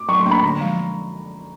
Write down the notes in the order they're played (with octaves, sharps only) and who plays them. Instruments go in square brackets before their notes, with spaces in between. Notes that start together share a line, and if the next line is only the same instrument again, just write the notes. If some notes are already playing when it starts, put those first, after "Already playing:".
Already playing: [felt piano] D6
[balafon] F#3 [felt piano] C#6
[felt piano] C6
[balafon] A#3 D4
[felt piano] B5
[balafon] D3 [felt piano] A#5
[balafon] F3 G#3